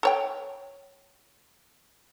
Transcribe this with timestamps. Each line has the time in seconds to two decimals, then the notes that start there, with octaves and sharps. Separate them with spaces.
0.03 A4 C#5 G5